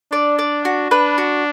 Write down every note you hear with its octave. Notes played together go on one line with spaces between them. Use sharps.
D4 D5
D5
F#4
D4 B4
F#4